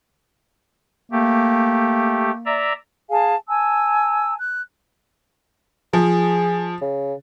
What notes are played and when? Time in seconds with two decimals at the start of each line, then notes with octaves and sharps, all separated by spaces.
1.12 A3 A#3 G4
2.46 D5 E5 A#5
3.10 G#4 F5 G#5 A5
3.48 G#5 A5 E6
4.41 F#6
5.93 F3 G#4
6.82 C#3